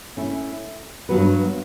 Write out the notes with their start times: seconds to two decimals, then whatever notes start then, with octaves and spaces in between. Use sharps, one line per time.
0.17 A3 C#4 E4
1.09 G2 F#3 B3 F#4 B4